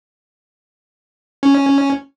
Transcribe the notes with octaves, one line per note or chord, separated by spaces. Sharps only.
C#4